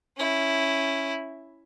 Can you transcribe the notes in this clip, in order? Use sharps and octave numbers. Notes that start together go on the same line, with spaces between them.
C#4 E4